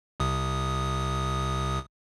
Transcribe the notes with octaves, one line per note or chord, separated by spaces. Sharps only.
C2 C3 D#6